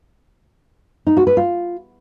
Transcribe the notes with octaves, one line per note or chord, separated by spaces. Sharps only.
D#4
F#4
B4
F4